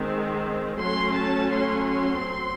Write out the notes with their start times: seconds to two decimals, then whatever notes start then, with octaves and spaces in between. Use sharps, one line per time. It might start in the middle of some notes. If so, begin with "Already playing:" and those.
Already playing: D#3 G#3 C4
0.81 F#3 A3 C#4 C6
1.17 A5
1.52 C6
1.87 C6
2.22 F#3 C4